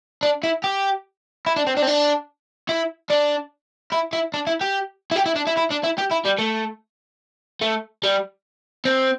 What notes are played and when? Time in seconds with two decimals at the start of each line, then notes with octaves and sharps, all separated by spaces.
0.23 D4
0.43 E4
0.64 G4
1.47 E4
1.56 D4
1.67 C4
1.77 D4
1.82 C4
1.87 D4
2.69 E4
3.10 D4
3.92 E4
4.13 E4
4.34 D4
4.47 E4
4.61 G4
5.11 E4
5.16 G4
5.26 E4
5.36 D4
5.47 E4
5.57 E4
5.71 D4
5.84 E4
5.98 G4
6.11 E4
6.26 G3
6.39 A3
7.61 A3
8.03 G3
8.85 C4